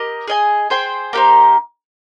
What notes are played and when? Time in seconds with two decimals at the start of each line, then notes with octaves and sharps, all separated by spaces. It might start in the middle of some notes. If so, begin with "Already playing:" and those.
Already playing: G4 A#4 D#5
0.28 G#4 D#5 G#5
0.70 G#4 C5 G5
1.13 A#3 D#4 G4 C5